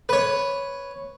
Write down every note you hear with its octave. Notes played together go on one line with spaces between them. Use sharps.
B4 C#5